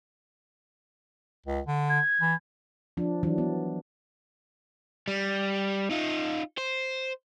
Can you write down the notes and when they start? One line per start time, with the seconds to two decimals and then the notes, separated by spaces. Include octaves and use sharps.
1.46 C#2
1.67 D3
1.89 G#6
2.21 E3
2.97 F3 D4
3.23 E3 F#3 D4
3.38 B3
5.08 G3
5.90 D#4 F4
6.58 C5